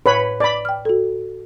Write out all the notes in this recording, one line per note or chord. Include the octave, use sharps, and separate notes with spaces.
A2 B4 C#5 B5
D5 B5
G5 F6
F#4 A4